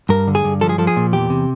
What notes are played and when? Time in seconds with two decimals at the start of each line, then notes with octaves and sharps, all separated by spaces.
0.09 G2 A#4
0.27 D3
0.35 G#4
0.44 G2
0.61 F3 A4
0.69 G#4
0.78 F3 A4
0.87 G#4
0.96 A#2
1.13 E2 G4
1.30 C3